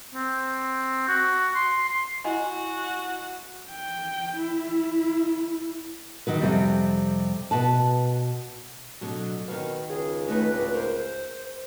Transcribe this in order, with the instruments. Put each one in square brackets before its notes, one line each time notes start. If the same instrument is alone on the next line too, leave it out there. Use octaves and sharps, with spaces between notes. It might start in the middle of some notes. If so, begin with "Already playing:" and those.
[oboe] C4
F#4
C6
C6
[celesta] E4 D#5 G#5 [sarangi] F#4
[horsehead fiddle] G5
E4
[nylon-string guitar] D#3 F#3 B4
F2 C3 G3
B2 B4 A5
B2 D3 F#3
[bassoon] B2 [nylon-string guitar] D#3 F5
[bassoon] C#2 [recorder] G#4
[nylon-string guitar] D#3 A3 D#4 [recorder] B4
[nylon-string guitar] F#4 D5
[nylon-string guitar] A#4 [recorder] C5